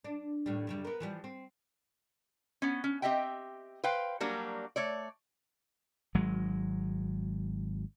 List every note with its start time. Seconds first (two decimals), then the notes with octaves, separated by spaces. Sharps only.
0.04 D4
0.46 D#2 A2 G3
0.67 F#2 C#3 G3
0.85 B3 A#4
1.00 E3 F3 G3
1.24 C4
2.62 B3 C#4
2.84 C#4
3.02 C4 G4 D#5 E5 G5
3.84 B4 C5 F5 G5
4.20 F#3 G3 A#3 D4 F#4
4.76 A3 C#5 D5
6.15 G#1 F#3 G#3